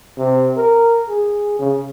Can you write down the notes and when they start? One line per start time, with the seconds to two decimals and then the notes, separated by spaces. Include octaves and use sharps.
0.18 C3
0.56 A#4
1.08 G#4
1.59 C#3